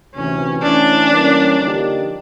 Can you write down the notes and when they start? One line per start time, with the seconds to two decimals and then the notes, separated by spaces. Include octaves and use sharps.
0.15 D2 C3 E3 C#4
0.62 E3 A3 C#4 D4
1.10 E3 G3 A#3 C#4
1.58 D3 F3 A#3 D#4 G4